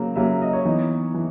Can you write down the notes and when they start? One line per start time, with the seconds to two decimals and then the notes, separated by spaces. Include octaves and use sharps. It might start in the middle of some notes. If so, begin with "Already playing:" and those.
Already playing: C#3 F#3 A#3
0.16 C#3 F#3 A#3 E5
0.42 D#5
0.53 C#5
0.65 E3 B3 D#4
1.14 E3